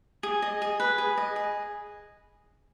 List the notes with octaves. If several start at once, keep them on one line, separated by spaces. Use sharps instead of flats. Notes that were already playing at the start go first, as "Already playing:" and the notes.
G#4
D#5
G#4
B4
G#4
D#5
G#4